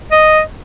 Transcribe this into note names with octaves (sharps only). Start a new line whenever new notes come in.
D#5